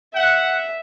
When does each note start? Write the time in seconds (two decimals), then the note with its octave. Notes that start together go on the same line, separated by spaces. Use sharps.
0.15 E5 F#5